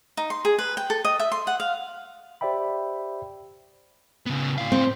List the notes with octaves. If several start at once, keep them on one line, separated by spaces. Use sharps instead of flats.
D#4
C6
G#4
B4
G5
A4
D#5
E5
C6
F#5
F5
G4 C5 D5 E5 G5 B5
C#3 B3
A2 F5
C4